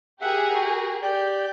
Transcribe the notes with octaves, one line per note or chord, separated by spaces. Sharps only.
G4 G#4 A#4 E5 F#5
F#4
G4 D5 G6